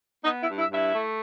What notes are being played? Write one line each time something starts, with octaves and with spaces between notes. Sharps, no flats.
B3 D#4 D#5
E4 E5
G2
E4 E5
G2
E4 E5
A3